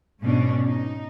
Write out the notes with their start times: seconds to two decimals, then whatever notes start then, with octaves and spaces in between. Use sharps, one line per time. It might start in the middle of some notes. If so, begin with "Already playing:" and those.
0.21 G#2 B2 C#4 D4
0.65 D#4